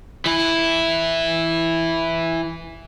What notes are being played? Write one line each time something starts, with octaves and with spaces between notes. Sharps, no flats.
E3 E4